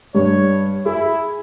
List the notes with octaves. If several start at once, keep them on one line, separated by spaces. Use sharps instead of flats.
G2 C#5
E4 G#4